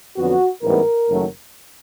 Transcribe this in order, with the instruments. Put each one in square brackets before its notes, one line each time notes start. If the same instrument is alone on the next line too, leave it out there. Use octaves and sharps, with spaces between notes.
[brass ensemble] F2 D3 F#3 B3 F#4
A1 G#2 E3 G3 B3 A#4
F#1 F#2 D#3 F#3 A3